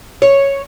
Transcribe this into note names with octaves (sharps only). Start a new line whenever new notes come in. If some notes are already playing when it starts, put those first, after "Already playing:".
C#5